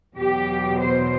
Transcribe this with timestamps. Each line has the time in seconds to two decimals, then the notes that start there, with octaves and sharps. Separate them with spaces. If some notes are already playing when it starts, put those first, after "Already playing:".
0.17 E2 B2 F#3 G4
0.79 C5